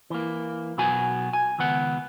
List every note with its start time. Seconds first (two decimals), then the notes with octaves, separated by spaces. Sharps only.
0.10 E3 A#3
0.78 B1 B3 F#4 G#5
1.33 G#5
1.59 C#2 D#3 B3 F#5